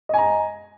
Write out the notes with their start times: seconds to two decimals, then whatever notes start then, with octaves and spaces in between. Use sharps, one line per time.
0.09 D#5
0.14 G#5
0.18 A#5